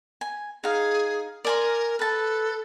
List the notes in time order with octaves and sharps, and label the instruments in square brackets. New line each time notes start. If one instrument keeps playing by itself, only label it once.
[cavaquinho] G#5
[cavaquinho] D#4 F5 [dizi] G#4
[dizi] A#4 [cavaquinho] D5 G#5 C6
[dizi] A4 [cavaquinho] B4 A5